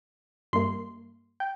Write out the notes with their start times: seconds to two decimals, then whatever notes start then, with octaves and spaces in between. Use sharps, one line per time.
0.53 G2 G3 A#3 C6
1.40 G5